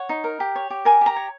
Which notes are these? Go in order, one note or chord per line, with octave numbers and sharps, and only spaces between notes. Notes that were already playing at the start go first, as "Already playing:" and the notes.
Already playing: C#5 F#5
D#4
A#4
G4
C#5
G4
A#4 G#5
G4 A#5
C#5